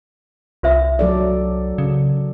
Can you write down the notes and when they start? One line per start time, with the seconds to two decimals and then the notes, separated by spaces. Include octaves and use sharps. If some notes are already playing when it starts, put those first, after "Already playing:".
0.63 C2 F4 C5 E5
0.99 F#3 A4 D5
1.78 C#3